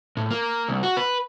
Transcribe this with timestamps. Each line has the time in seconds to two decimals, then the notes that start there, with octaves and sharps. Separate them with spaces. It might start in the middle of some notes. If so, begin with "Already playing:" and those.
0.17 A2
0.31 A#3
0.68 C2
0.83 F#4
0.97 B4